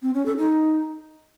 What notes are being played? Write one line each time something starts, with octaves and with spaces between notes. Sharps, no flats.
C4
C#4
A4
D#4